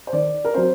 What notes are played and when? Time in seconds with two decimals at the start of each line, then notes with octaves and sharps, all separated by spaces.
0.07 C5
0.13 D#3 D5
0.45 A#4
0.54 F#3 C4 C5